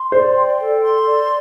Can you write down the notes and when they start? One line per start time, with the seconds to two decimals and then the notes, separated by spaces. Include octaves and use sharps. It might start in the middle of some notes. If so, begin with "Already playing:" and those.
Already playing: C6
0.12 C5 D5
0.36 G5
0.59 A4
0.83 C6
1.07 D5